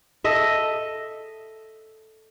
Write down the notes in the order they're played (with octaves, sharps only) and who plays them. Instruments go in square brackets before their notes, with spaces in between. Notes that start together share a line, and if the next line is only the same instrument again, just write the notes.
[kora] A4 D#5 E5